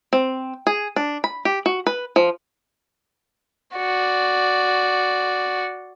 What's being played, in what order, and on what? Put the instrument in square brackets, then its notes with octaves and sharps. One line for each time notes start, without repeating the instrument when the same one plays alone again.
[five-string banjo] C4
G#4
D4
B5
G4
F#4
B4
F3
[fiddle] F#4 D5